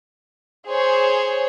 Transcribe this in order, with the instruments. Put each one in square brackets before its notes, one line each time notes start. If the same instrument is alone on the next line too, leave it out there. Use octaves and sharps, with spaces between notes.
[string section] G#4 C5 C#5